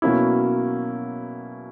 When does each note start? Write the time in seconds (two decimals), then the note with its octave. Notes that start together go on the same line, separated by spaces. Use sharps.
0.02 B2 F#3 A#3 C#4 E4